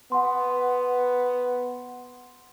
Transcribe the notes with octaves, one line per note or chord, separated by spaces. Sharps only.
B3 F#5 C6